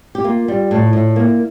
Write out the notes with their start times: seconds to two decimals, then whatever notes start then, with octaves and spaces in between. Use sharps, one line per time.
0.15 G4
0.24 A#3 F4
0.48 G3
0.71 A2
0.93 A2
1.16 A#3